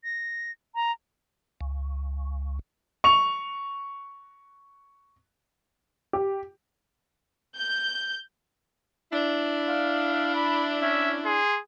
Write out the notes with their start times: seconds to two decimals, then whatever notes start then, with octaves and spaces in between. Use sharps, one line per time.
0.04 A#6
0.75 A#5
1.61 C#2
3.04 C#6 F7
6.13 G4
7.58 G6
9.13 D4 E4
9.68 F5
10.35 B5
10.82 C#4 E5
11.25 G#4 C6